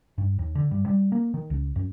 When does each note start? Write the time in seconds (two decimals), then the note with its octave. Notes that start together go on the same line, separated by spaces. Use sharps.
0.18 G2
0.39 D#2
0.55 D3
0.71 G2
0.86 G3
1.12 A#3
1.34 D#3
1.50 C#2
1.76 F#2